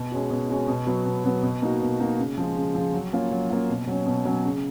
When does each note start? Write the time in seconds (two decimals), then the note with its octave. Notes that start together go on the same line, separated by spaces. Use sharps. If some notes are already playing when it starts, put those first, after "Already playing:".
Already playing: B2
0.11 G#3 C#4 F#4
0.30 B2
0.50 G#3 C#4 F#4
0.68 B2
0.86 F#3 B3 F#4
1.05 B2
1.24 F#3 B3 F#4
1.43 B2
1.62 A#3 D#4 F#4
1.81 B2
2.00 A#3 D#4 F#4
2.19 C#3
2.38 F3 G#3
2.56 C#3
2.75 F3 G#3
2.94 F#3
3.13 A#3 C#4 F4
3.31 F#3
3.50 A#3 C#4 F4
3.69 B2
3.87 F#3 C#4
4.06 B2
4.25 F#3 C#4
4.45 C#3